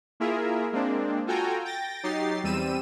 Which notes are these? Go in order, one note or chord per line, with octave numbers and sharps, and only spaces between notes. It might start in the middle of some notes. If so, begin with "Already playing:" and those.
A#3 E4 F4 G#4 A#4 E5
G#3 A#3 C4 D4
F4 F#4 A4 G5 G#5 A#5
G5 A6 A#6
F#3 D#4 G4 A6 C7
E2 G3 C4 E6 D#7 E7